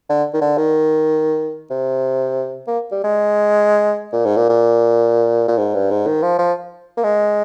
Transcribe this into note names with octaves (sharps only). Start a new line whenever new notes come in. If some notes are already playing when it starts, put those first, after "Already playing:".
D3
D#3
D3
D#3
C3
A#3
G3
G#3
A#2
G#2
A#2
A#2
A#2
G#2
G2
G#2
D#3
F3
F3
A#3
G#3